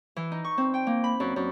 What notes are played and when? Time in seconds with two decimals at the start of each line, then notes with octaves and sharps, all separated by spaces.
0.16 E3
0.32 D#4
0.44 C#6
0.58 C4
0.74 G5
0.87 A#3
1.04 B5
1.20 F#2
1.36 F#2